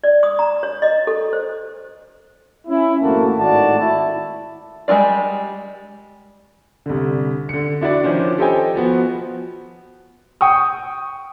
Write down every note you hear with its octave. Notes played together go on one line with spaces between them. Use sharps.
D5
D#6
A#5
C#5
D#5
A4
C5
C#4 E4
G#1 F2 A3 A#3 F#4 A5
G#1 A2 D#3 F#4 D5 A5
E4
G3 G#3 C#4 F4 D5
C2 D3
D3 C#7
D4 E4 F#4 D5
D#3 F3 C#4 D4
G4 A4 C5 D#5 G5 G#5
F3 B3 F#4
G5 C#6 D#6